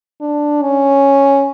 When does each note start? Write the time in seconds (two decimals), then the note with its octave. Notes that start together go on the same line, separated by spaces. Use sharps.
0.21 D4
0.62 C#4